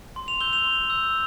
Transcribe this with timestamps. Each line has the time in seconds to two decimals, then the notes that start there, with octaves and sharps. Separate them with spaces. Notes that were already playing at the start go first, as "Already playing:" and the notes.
0.16 C6
0.28 F7
0.40 E6 G6 G7
0.53 F7
0.64 C6
0.90 E6 G6